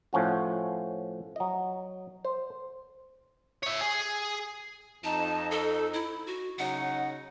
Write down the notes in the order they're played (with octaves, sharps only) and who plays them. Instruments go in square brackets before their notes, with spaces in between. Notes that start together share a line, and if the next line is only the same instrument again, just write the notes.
[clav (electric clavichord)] A2 F3 C#4 F#4
F#3 D#5
C5
[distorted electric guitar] C#5 E5
G#4
[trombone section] F2 D#4 [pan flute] A5
[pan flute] A4
E4
F#4
[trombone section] C#3 F#3 D#4 [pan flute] F#5